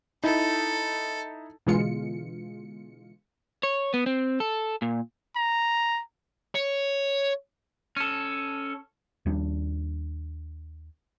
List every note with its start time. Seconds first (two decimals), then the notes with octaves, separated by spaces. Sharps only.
0.24 D#4 E4 A4
1.67 B2 D3 E3 G#3 F4 C#7
3.63 C#5
3.94 B3
4.06 C4
4.40 A4
4.82 A#2
5.36 A#5
6.55 C#5
7.96 C#4 A4
9.26 D#2 G3 D4